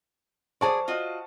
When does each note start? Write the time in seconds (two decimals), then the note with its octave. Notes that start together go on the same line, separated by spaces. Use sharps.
0.61 F#3 G#4 C5 D5 A5 C#6
0.88 F4 F#4 D#5